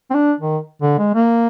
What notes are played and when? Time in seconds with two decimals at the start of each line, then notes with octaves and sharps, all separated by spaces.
0.10 C4
0.14 D4
0.40 D#3
0.82 D3
0.99 G#3
1.15 A#3